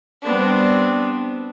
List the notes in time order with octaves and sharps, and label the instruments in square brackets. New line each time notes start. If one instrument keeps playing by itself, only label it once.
[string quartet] G3 B3 C4 D4